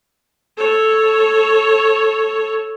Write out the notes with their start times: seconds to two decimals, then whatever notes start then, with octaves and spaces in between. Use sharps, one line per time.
0.57 A4 C#5